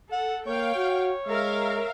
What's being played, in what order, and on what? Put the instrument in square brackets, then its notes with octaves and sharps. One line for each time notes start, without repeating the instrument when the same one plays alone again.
[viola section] A4 [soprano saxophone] F#5
[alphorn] A#3 [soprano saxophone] C#5 [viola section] F5 G5
[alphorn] F#4
[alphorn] G#3 [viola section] A#4 E5 F5